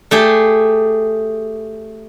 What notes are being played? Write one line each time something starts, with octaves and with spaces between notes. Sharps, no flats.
A3 G4 G#4